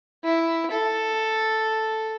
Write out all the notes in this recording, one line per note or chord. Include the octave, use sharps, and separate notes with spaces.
E4
A4